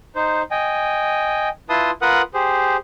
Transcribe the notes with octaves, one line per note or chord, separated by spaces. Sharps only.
D#4 C5
D#5 G5 G#5
E4 F4 B4 A5 C6 D#6
F4 A#4 B4 F#5 D#6 F#6
G4 G#4 C5